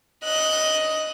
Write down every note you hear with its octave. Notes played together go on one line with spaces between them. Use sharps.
D#5 F#6